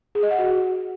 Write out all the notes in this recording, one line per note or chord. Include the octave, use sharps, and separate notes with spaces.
G#4
D#5
F#5
F#4